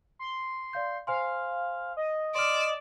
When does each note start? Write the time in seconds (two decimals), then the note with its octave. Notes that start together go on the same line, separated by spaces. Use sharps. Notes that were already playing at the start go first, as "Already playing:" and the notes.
0.19 C6
0.73 D5 F5 G6
1.07 C5 F5 G#5 C6
1.97 D#5
2.35 D5 C6 F6 E7